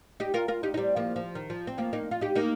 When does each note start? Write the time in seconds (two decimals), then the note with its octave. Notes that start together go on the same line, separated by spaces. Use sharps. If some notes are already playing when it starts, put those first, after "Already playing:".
0.20 D#4 G4
0.34 F4 A#4
0.48 F4 A#4
0.63 D#4 G4
0.74 D#4
0.77 G3 C4
0.96 F3 A#3
1.16 F3
1.35 D#3
1.50 F3
1.67 C4
1.78 F3 A#3
1.93 A#3 D#4
2.11 F4
2.21 D#4 G4
2.35 A#3 D#4